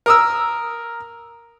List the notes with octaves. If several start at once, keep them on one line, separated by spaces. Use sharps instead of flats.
A#4 D#6 E6